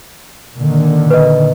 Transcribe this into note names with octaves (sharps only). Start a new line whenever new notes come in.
A#2 D3 D#3
B4 D#5